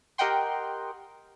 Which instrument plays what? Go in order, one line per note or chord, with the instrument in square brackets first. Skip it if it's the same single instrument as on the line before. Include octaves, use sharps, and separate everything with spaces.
[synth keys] G4 A#4 D#5 F#5 G5 C6